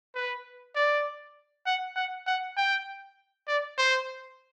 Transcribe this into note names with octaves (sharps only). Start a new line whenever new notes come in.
B4
D5
F#5
F#5
F#5
G5
D5
C5